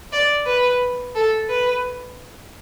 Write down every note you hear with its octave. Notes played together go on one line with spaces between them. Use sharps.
D5
B4
A4
B4